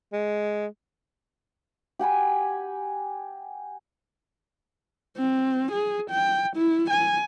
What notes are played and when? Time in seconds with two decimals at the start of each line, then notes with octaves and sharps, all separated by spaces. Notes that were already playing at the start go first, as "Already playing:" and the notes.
0.13 G#3
1.99 G4 F#5 G#5 B5
5.17 C4
5.72 G#4
6.10 G5
6.56 E4
6.90 G#5